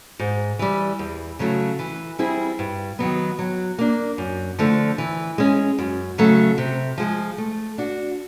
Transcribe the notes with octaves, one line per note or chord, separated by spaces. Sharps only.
G#2
E3 G3
E2
C#3 F#3 A3
E3
G3 C4 E4 G#4
G2
D#3 F#3 B3
F#3
A#3 D4
F#2
D3 F3 A3
E3
G#3 C#4
F#2
C#3 F#3 A3
C3
F3 G#3
A3
D4 F#4